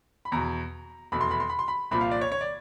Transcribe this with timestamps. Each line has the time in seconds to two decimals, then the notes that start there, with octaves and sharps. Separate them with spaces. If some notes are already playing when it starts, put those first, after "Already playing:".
0.25 B5
0.32 E2 B2 A#5
1.12 F1 E2 B2 B5
1.21 C6
1.31 B5
1.40 C6
1.49 B5
1.59 C6
1.68 B5
1.91 C2 A#2 F3 B5
2.01 F5
2.11 D5
2.21 C#5
2.32 C#5
2.41 D5